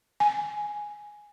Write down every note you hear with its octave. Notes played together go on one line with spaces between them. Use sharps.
G#5